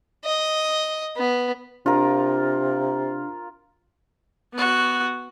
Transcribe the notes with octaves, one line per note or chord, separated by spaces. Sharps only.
D#5
B3
C3 D4 F4 A#4
B3 F#4